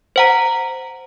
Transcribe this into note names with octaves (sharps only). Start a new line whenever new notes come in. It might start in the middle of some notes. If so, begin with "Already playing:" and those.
C5 F#5 A#5